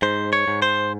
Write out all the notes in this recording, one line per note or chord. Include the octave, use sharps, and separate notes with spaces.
G#2 C5
C#5
G#2
C5